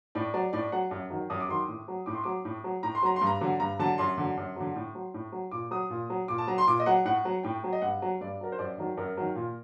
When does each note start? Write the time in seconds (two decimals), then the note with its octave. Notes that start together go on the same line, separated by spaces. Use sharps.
0.15 A2 D5
0.34 F#3 D5
0.53 A2 D5
0.72 F#3 F#5
0.91 F#2
1.10 D#3 F#3
1.30 F#2 D#6
1.40 D6
1.48 D#3 F#3 C6
1.60 D6
1.68 A2
1.88 F#3
2.06 A2 D6
2.15 C6
2.24 F#3 D6
2.45 A2
2.64 F#3
2.83 A2 A#5
2.95 C6
3.03 F#3 A#5
3.16 C6
3.21 G2
3.27 A#5
3.41 D3 F#3
3.60 G2 A#5
3.79 D3 F#3 A5
3.98 F#2 C6
4.18 D3 F#3
4.37 F#2
4.56 D3 F#3
4.76 A2
4.95 F#3
5.14 A2
5.32 F#3
5.51 A#2 D6
5.71 F#3 D#6
5.90 A#2
6.10 F#3
6.28 A#2 D6
6.38 A5
6.47 F#3 A#5
6.58 C6
6.67 A#2 D6
6.80 D#5
6.86 F#3 F#5
7.05 A2 F#5
7.25 F#3
7.43 A2 G5
7.64 F#3
7.73 D#5
7.82 G2 F#5
8.02 F#3
8.21 G2 D5
8.41 F#3 A#4
8.52 C5
8.59 F#2 D5
8.78 D#3 F#3
8.97 F#2 A#4
9.17 D#3 F#3
9.35 A#2